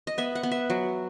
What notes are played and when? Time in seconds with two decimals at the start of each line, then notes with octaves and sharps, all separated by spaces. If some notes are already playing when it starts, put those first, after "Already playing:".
0.07 D#5
0.18 B3 E5
0.35 F#5
0.43 B3
0.52 E5
0.70 F#3